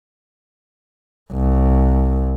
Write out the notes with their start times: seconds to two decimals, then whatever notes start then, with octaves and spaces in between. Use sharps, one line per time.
1.32 C2